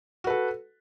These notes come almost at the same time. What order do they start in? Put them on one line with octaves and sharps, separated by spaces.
F#4 B4 A4